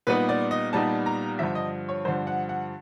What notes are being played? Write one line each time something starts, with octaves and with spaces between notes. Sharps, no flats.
A#2 G3 B3 D#4 B4
D5
D#5
A#2 G3 B3 D#4 A5
A#5
G2 D3 F3 E5
D#5
C#5
G2 D3 F3 C5
F#5
F#5